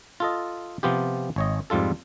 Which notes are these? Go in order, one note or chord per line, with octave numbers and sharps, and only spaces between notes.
F4 A4 D#5
C3 F3 B3 F4 G4
G#1 C#5 D#5
F2 G#2 G3 F4 A4